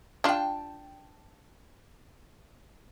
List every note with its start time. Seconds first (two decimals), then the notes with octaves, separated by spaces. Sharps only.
0.24 D4 F4 G5 A5